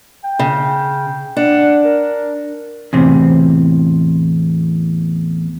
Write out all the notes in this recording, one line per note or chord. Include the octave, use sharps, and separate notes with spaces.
G5
C#3
D4 F#5
A#4
E2 A2 C3 C4